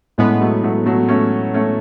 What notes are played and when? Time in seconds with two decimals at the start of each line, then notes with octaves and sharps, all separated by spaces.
0.18 A2 G#3 A3 B3 C#4
0.41 F#3 A3
0.63 F#3 A3
0.86 F#3 A3
1.08 A3 C#4
1.54 A3 C#4